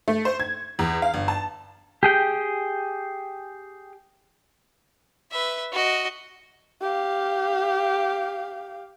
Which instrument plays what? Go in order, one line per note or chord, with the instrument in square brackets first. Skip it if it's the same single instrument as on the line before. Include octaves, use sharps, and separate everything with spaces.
[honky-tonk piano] A3
C5
G#6
E2
F5
G1
A5
[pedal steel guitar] G4 G#4 G5
[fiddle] B4 E5
F#4 D#5
[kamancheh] G4 F5